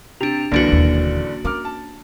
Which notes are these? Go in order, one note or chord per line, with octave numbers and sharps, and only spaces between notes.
C3 D4 F7
F#1 C2 D3 E3 A#3 D4 F#4
E1 D#2
C#4 A#4 D6 F6
A5